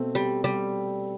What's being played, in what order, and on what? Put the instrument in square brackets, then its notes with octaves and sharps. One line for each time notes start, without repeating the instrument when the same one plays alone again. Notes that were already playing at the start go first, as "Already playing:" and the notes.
Already playing: [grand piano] B2 A3 C4
[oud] G3
G3